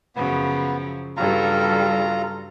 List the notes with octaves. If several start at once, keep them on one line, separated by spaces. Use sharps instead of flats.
F#2 C#3 F3 B3
G2 C#3 F#3 G3 F4 A4 A#5